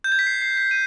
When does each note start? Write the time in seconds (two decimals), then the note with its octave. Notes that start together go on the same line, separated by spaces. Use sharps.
0.04 G6
0.12 G#6
0.19 B6
0.27 C7
0.42 C7
0.57 B6
0.71 D#7